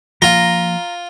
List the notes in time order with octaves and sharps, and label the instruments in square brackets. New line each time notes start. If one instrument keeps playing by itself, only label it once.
[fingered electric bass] F3 A#3 [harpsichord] F4 [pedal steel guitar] A#5